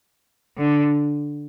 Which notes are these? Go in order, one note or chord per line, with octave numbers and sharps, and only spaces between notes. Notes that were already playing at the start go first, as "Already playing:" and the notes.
D3